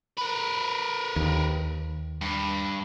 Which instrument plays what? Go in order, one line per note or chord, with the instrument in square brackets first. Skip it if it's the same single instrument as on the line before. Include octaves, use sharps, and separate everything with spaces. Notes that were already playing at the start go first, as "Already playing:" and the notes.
[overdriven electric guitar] A#4 B4
[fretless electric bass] D#2
[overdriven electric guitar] G2